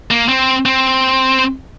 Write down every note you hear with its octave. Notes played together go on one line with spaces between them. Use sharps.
A#3
C4
C4